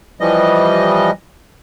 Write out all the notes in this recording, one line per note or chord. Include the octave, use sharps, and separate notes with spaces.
E3 F3 G3 D#5